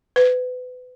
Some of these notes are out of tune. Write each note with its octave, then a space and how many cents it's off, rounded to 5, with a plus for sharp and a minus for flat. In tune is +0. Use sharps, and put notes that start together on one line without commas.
B4 +30